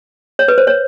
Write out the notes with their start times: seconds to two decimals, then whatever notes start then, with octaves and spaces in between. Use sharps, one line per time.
0.39 C#5
0.48 B4
0.58 C5
0.67 C#5